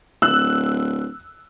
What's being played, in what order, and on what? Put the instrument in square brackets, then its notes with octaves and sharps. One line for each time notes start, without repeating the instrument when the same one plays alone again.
[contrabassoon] D1 [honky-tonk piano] E6 F#6